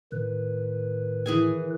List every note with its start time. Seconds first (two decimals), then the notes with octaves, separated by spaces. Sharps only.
0.12 A2 D#3 B4
1.26 E3 G#4 G#5